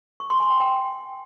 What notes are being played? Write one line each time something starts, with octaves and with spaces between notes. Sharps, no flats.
C#6
C6
G#5
G5
G5